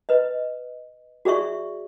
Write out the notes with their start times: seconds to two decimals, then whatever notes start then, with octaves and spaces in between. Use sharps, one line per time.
0.09 B4 D#5
1.25 F#4 G#4 D5 E5 C#6